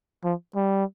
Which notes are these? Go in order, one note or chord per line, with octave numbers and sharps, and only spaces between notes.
F3
G3